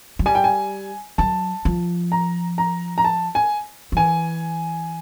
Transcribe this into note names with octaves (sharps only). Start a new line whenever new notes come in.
F#3
G3 G#5
G5
G#5
F#3 A5
F3
A#5
A#5
A#5
A5
G#5
F3
E3 G#5